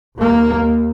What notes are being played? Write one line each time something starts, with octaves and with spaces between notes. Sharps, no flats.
D#2 A#3